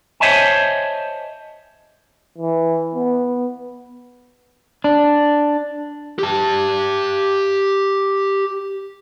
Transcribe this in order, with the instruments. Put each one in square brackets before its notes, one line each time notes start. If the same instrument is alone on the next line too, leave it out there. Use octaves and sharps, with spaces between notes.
[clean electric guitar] C5 C#5 D#5 E5 G#5 A5
[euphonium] E3
B3
[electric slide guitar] D4
[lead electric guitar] G4 A5